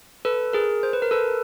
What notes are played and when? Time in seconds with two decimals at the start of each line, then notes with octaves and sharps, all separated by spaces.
0.25 A4 B4
0.53 G#4 A#4
0.83 C5
0.93 B4
1.02 A#4
1.11 A4 B4